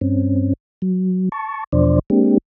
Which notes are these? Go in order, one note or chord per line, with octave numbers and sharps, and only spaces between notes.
G2 C4 C#4
F#3
A5 C#6
E2 B2 F3 D4 C5 D5
G#3 A#3 C4 D4 G4